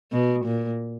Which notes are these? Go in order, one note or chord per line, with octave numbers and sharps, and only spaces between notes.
B2
A#2